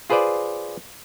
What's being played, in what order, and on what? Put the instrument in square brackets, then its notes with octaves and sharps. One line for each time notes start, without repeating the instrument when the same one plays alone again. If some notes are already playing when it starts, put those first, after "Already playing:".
[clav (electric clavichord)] F4 G#4 B4 C5 D5